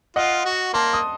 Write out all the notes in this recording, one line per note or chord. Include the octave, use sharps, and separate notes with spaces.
F4 D#5 F#5
F#4
A#3 A5 C6
D#6